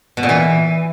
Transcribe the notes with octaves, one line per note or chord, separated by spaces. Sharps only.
B2
A#2
E3